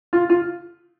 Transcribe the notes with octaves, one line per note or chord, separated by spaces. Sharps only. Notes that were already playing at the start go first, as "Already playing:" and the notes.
F4
F4